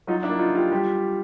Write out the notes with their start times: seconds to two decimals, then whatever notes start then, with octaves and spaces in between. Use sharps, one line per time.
0.07 F#3 D#4 F4
0.23 D4 E4
0.29 A#3
0.39 D#4 F4
0.49 D#3
0.55 F4 G4
0.71 G3 F4 G4